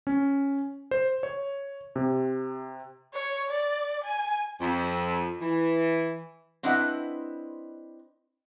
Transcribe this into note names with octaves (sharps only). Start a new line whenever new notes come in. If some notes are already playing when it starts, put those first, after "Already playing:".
C#4
C5
C#5
C3
C#5
D5
G#5
F2
E3
C4 D4 E4 B4 D#5 F#5